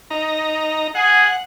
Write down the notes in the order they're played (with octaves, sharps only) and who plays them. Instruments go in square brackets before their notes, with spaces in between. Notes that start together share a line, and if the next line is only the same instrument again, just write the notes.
[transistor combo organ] D#4 A#5
[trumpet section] G#4 [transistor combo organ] F#5